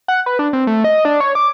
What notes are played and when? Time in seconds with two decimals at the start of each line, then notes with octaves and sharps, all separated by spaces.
0.08 F#5
0.26 B4
0.39 D4
0.53 C4
0.67 A3
0.84 D#5
1.05 D4
1.20 C#5
1.35 D6